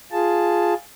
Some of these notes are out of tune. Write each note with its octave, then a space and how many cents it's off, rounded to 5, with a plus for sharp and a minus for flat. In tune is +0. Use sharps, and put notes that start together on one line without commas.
F4 +0 G#4 +0 A5 +0